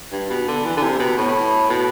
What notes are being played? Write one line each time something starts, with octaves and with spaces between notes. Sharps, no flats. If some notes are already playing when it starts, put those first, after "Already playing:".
G2
B2
D3
E3
D3
C3
B2
A2
B2